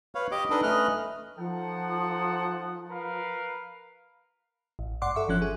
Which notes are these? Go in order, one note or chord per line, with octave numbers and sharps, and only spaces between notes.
B4 C#5 F5
G4 D#5 D6
D4 D#4 A4 B4 D#5
A3 C#4 B4 D#5 F6 F#6
F3 D#4 A4 F#5
A#4 B4 F5
A1
G2 D5 F#5 C6 D6
A4 E5 C#6
G1 F3 C#4 F#6
G#4